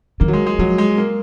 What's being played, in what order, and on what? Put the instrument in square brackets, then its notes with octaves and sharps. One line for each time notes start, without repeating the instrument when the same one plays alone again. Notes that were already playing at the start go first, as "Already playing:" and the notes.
[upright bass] D#3 [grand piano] A#3
[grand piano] F#3
G#3
G#3
[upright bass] F3 [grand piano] F#3
[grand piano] G#3
A#3